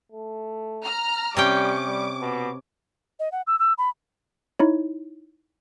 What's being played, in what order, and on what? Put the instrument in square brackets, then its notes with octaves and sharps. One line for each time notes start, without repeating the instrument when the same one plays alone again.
[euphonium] A3
[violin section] A#5 F6
[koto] C3 C#4 G5 [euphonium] G3 [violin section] D6
[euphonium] G3
B2
[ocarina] D#5
F#5
E6
E6
B5
[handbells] D#4 E4 C#5